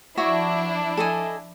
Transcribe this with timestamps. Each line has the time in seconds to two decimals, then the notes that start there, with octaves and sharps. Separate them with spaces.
0.17 F3 D4 E4 F#4 C#5 E5
0.97 A4 D#5 G#5